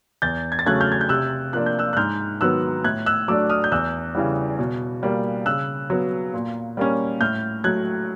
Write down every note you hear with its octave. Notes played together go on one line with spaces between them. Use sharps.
E2 G6 A6
G#6
A6
C#3 F#3 A3 C#4 F#6 G#6
F6 G6
G#6
G6
C3 E6 F#6
F3 A#3 D4 F#6
G6
E6 F#6
F#6
G#2 F6 G6
D#3 F#3 B3 E6 F#6
A2 F#6 G#6
E6 F#6
F#3 A3 D4 D6 E6
D#6 F6
G6
E2 E6 F#6
C#3 E3 G3
B2
G3 A#3
C#3 E6 F#6
F#3 B3
A#2
G3 A#3 C#4
A2 F6 G6
F#3 A3 F#6 G#6